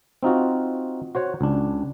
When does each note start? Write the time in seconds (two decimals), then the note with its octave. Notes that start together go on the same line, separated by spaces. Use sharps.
0.23 C4 D#4 F4 F#4
1.15 F#4 C5 C#5 F#5
1.41 C#2 D4